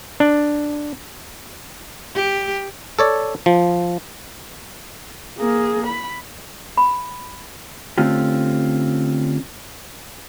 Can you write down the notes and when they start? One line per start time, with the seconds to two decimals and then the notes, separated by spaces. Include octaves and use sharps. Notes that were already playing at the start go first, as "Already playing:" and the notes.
0.20 D4
2.15 G4
2.99 A4 C#5 D5
3.46 F3
5.38 A#3 G#4
5.87 B5
6.77 B5
7.98 D3 A3 C4 C#4 F4 G4